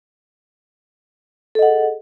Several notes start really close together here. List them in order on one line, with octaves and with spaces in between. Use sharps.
A4 D#5 F#5 G#4